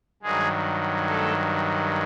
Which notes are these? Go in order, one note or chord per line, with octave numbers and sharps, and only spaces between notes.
G2 D#3 F#3 G#3 G#4
A3 A4